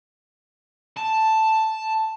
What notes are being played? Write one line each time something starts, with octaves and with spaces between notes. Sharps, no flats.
A5